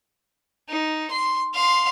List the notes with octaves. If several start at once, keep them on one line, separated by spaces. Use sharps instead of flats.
D#4
C6
F5 C6